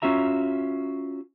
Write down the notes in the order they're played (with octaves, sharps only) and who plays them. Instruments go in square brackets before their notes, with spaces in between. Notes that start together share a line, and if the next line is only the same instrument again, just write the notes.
[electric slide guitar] C#4 F4 F#4 E5 A#5